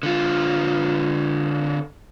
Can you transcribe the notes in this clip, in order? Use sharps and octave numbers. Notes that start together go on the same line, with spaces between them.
D3 F4